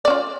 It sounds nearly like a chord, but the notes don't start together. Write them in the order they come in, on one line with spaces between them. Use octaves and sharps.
D5 C#4 F4